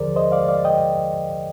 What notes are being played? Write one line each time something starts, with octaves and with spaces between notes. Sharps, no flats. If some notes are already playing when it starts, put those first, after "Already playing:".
Already playing: D#2 D3 F3 G#4 A#4 C5 D5
C5 D#5
D5 F5
D5 F5
D#5 G5